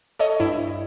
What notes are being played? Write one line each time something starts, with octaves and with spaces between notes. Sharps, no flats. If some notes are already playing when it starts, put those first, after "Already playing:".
A4 C#5 D#5
G2 E4